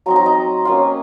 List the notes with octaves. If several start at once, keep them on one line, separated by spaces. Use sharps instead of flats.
F#3 C4 D#4 A#5
A#5
D#5
A#3 C#4 F4